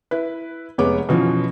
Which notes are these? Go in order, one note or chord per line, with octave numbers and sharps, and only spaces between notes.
E4 B4
F1 G#3 B3 C#5 D6
B2 E3 F3 C#4 F4